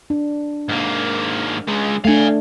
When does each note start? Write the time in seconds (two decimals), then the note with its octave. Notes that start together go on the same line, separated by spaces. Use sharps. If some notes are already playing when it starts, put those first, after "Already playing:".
0.10 D4
0.69 G#2 A#3
1.68 C#2 G#3
2.05 A3 D4 F5 G#5